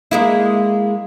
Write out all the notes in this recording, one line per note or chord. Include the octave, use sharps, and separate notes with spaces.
G#3 A#3 E4